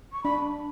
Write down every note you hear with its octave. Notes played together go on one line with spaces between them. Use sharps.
C#6
D4 B5